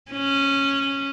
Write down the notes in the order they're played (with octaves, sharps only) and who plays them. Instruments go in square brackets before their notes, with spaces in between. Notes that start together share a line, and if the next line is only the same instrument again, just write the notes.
[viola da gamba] C#4